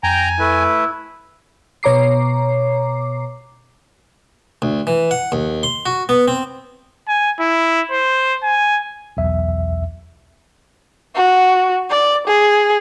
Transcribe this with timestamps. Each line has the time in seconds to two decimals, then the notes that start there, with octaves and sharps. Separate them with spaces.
0.03 F2 G5 G#5 A#5
0.40 A3 E4 B4
1.83 B2 C#5 A#5 D6 C7
4.62 D2
4.87 E3
5.11 F#5
5.32 D#2
5.63 C6
5.86 F#4
6.09 B3
6.28 C4
7.08 G#5
7.40 E4
7.91 C5
8.43 G#5
9.17 B1 E2 E5
11.15 F#4
11.90 D5
12.27 G#4